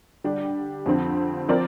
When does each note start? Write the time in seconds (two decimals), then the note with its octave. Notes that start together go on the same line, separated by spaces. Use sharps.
0.24 D3 G3 D4 G4
0.86 F2 D3 F3 C4
1.49 F3 C4 A#4 D5